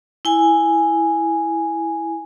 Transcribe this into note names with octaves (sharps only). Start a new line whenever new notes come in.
E4 G#5